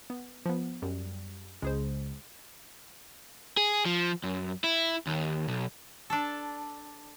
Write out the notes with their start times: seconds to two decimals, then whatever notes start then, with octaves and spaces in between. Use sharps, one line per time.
0.10 B3
0.46 F3 B3
0.82 F#2 G3
1.62 C#2 G#3 G#4 C5
3.57 G#4
3.86 F3
4.24 F#2
4.64 E4
5.07 D#2
5.48 B1
6.10 D4 A4